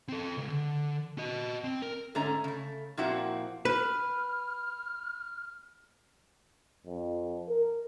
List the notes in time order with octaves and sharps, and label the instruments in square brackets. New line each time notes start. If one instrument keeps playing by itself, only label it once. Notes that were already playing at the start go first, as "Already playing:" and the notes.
[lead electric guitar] C4 A4
C#2
D3
F#4 D#5
C4
A#4
[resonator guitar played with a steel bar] G#2 D3 A3 C#4 A#5
C#3 A3
A#2 F3 A#3 C4 E4 F#4
[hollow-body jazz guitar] B4 [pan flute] F6
[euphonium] F2
A#4